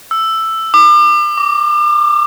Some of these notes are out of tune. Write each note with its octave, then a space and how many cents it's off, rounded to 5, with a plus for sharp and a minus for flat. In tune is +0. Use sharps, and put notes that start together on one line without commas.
E6 +5
D6 +35
D6 -15